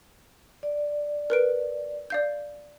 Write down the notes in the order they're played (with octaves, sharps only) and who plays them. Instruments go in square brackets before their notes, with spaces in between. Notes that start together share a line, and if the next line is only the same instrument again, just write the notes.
[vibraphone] D5
[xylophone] A#4 B4 D7
D5 F5 G6